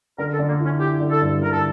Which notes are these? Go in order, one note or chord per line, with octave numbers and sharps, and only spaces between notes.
D3 A#4
A4
D3
A#3
C#4 E4
E4 G4
D3
A4
G2
D3 A#4
A4